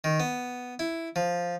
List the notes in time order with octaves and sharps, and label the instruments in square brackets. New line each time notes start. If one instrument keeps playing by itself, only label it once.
[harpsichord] D#3
B3
E4
F3